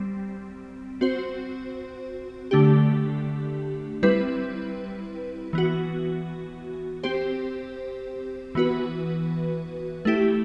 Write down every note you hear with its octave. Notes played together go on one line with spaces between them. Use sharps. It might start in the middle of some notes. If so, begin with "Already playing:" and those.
Already playing: G3 C4
C4 F#4 C5
D3 A3 D4 G4
G3 C4 E4 B4
E3 B3 F#4
C4 G4 C5
E3 B3 F#4 B4
A3 E4 G4